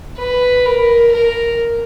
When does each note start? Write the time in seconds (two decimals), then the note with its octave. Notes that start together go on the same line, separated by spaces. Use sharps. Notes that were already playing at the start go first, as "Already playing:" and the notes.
0.19 B4
0.66 A#4
1.13 A#4